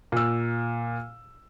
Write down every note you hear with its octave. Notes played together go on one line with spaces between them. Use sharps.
A#2 E6